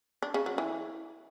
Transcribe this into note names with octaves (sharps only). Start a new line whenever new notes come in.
D4
C#3
F#3
E3